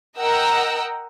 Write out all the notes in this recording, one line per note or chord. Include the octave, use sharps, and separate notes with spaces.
A#4 D#5 F#5 G5 A#5 E6